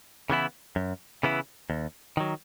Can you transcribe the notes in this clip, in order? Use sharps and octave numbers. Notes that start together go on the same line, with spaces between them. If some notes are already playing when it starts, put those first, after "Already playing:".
C#3 E3 B3 E4
F#2
C#3 E3 B3 E4
D#2
D#3 F#3